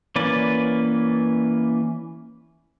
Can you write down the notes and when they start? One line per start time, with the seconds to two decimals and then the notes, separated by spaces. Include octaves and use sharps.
0.16 E3 A#3 C#4 B4 D5